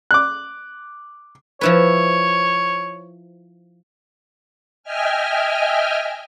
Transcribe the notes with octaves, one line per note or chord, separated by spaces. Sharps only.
D6 F#6
F3 E4 B4 C#5
D#5 E5 G5 G#5 F6